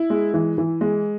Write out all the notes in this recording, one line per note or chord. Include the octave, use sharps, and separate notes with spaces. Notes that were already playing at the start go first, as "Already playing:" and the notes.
Already playing: E4
G#3
E3
E3
G#3